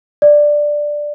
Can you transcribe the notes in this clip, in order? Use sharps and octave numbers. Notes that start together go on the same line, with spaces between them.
D5